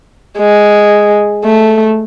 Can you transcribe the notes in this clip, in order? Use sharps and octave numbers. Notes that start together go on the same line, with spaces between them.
G#3
A3